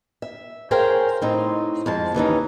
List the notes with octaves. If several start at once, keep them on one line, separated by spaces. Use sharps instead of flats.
E5
G#4 A#4 C5 C#5 F5 G5
A2 C4 D#4
F2 G#3 A5
D#2 E3 C#4 D#4